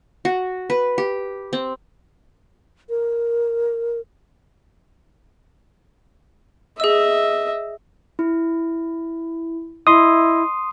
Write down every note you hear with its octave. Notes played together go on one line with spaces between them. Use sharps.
F#4
B4
G4
C4
A#4
G#4 D#5 E5 E6
E4
E4 D#5 C6 D#6